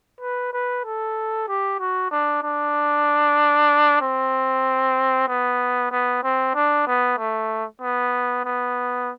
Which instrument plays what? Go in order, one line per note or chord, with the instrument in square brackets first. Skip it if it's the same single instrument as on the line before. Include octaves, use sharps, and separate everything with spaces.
[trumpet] B4
B4
A4
G4
F#4
D4
D4
C4
B3
B3
C4
D4
B3
A3
B3
B3